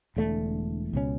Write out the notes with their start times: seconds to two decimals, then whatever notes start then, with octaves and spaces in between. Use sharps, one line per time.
0.16 E1 E2 D3 A3
0.93 C#2 B2 F#3 C#4